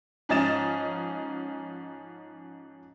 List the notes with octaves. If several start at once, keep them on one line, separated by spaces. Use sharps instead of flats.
G#2 F3 C#4 D#5 A6 E7